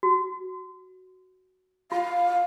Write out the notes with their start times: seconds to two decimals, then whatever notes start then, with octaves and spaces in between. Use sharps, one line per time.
0.03 F#4
1.92 F4 F5